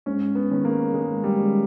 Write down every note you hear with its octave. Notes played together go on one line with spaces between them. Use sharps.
G#2 C#4
B3
D#3 G#3 C#4
A#3
G#2 G#3
G3
D#3 G#3 C#4